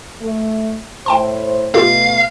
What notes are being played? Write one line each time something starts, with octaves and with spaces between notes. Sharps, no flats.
A3
A2 C5 G5 A5 C6
B2 A3 B3 F4 G4 A4 F5